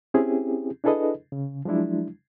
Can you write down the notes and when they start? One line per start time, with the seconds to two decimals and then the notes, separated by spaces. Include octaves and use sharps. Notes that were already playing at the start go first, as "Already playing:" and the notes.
0.14 C4 C#4 E4 G4 G#4
0.84 D4 E4 G#4 A4 B4 D#5
1.32 C#3
1.65 F3 F#3 G#3 D4 E4